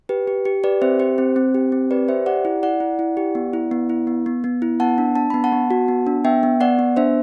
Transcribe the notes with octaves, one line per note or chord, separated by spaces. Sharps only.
G4 B4
G4
G4
G4 B4 D5
C4 C5 E5
G4 C5
C4 C5
C4
G4
C4
G4 B4 D5
G4 C5 E5
G4 D5 F#5
E4
E4 D5 F#5
E4
E4
G4
B3
E4
B3
E4
B3
B3
B3
E4
B3 F#5 A5
D4
D4 A5
B3 B5
F#5 A5
B3
F#4
B3
D4
B3 E5 G5
B3
B3 D5 F#5
B3
D4 C5 E5